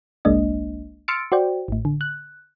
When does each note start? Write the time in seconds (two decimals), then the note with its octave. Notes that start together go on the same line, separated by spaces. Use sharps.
0.25 G1 C2 G#3 A#3 D4 D#5
1.08 C6 E6 F6 A6 C#7 D7
1.32 F#4 C5 D5 G5
1.68 A1 A2
1.85 D3
2.01 F#6